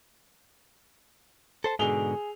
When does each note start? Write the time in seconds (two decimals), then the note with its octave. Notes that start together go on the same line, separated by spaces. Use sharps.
1.64 A4 C5 A5
1.79 G#2 B2 D3 G#4 F7 G7